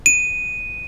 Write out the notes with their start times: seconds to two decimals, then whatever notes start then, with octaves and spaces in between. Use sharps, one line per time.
0.06 D#7